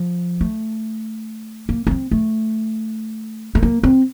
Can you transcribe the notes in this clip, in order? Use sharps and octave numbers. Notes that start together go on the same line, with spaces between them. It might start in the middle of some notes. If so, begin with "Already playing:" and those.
Already playing: F3
A3
A#3
A#3
C4
A3
A3
A#3
C4